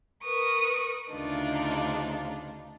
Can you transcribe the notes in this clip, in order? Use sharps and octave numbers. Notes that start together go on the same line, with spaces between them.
A#4 B4 C#6 D#6
D2 C#3 D4 D#4 F4